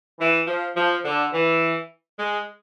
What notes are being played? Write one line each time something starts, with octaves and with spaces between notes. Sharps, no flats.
E3
F3
F3
D3
E3
G#3